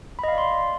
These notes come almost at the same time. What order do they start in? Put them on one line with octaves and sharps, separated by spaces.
B5 D#5 F5 D5 C6